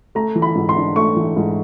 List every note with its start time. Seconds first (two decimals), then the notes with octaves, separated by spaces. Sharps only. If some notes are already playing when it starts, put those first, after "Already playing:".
0.15 A3 A#5
0.36 E3
0.42 B5
0.55 G#2
0.69 C6
0.76 D4
0.96 A3 C#6
1.16 E3
1.37 G#2